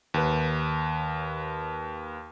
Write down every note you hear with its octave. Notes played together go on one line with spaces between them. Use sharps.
D#2 B4